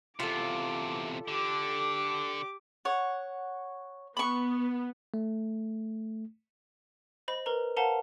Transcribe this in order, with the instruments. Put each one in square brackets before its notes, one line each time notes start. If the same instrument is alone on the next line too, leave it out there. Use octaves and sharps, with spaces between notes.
[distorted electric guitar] E2 C3 [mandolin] F4 A4 [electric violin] D6
[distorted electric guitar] D3 [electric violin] G4 D6
[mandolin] C#5 F#5
[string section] B3 [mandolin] B5 C#6
[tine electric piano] A3
[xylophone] C5 D#5 B5
A#4 B4 A#5
A#4 C5 F5 F#5 A5 A#5